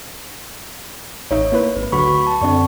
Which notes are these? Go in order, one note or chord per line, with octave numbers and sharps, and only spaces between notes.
A1 D#4 C#5 E5
A#3 E4 B4
G#1 B4
D2 F#3 F#4 B5 C#6
A5
F#2 D3 C4 D5 C#6